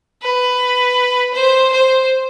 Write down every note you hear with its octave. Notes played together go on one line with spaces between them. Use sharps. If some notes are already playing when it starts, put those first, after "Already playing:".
B4
C5
C5